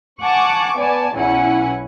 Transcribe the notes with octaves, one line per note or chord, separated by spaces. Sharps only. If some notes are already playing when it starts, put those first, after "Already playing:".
F#5 G#5 A5 C#6 D6
B3 D5 G#5 A5
B1 E2 C#4 E4 F#5 G#5